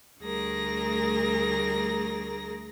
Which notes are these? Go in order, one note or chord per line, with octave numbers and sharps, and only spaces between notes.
D2 G3 A3 G#4 A#4 A#6